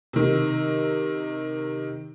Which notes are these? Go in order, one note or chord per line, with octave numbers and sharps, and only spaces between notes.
C3 D#3